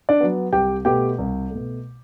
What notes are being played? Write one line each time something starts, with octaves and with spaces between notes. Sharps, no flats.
D4 D5
F#3 B3
C2 G4 G5
B2 A3 G4 G5
C2
B2 A3